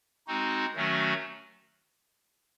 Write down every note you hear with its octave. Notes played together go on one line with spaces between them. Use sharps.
G#3 C4 D#4 F#4
D#3 F#3 A3 C#4 F#4